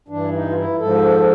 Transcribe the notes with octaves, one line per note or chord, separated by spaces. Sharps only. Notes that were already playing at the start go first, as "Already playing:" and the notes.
G2 E3 D4
D#4
F4
E4
G#2 F3 A4